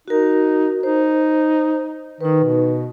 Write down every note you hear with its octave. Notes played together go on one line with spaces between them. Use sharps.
D#4 F#4 A#4
D#4 C5
D#3 D#4 B4
B2